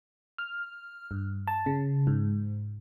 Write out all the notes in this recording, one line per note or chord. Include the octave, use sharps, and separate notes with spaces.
F6
G2
A5
C#3
G#2